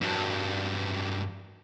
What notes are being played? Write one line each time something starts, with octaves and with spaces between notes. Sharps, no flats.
G2 F#3